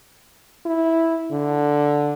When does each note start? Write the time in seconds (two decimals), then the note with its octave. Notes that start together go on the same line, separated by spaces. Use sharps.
0.66 E4
1.31 D3